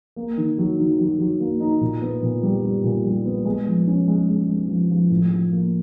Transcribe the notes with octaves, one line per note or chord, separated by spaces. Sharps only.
A#3
D#3
F#3
D#3
F#3
F#3
A#3
D#4
A#2
B3
A#2
G3
G3
A#2
G3
B3
G#3
F3
C#4
G#3
G#3
G#3
F3
F3
A2
F3
A#3